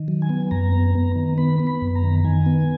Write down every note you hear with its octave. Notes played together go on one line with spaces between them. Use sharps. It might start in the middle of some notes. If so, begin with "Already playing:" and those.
Already playing: D#3
F#3
G#5
B3
F#2 A#5
B3
B3
D#3
B3 B5
B3
B5
F#2
A#5
D#3
D#3 G#5
B3